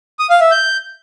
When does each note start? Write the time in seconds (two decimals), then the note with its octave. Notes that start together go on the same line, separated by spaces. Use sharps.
0.19 D#6
0.30 F5
0.41 E5
0.51 G6